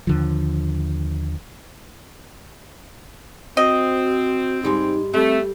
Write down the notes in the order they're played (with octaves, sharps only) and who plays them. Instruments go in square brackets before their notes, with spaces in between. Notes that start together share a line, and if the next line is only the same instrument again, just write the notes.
[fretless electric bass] D#2 D3 F3
[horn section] C4 [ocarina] F#4 [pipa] D#5
[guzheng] G#2 G3 G#3 [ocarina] D#4
[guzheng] G3 A4 B5 [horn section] A3 [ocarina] C4